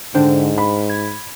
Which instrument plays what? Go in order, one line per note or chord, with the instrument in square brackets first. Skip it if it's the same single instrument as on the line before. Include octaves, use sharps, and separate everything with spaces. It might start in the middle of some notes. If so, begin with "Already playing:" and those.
[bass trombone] G#2 [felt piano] D3 [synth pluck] D4 C5 G5
[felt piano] B5
[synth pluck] G#6